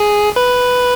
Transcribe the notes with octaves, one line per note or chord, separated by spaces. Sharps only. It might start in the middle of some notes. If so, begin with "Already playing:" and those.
Already playing: G#4
B4